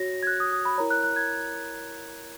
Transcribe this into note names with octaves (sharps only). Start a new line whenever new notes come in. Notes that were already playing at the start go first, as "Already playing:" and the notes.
Already playing: F#4 C#5 A#6
G#6
F#6
D#6
D#6
B5
E4 A#4 C#5 A#5
F#6
F#6
G#6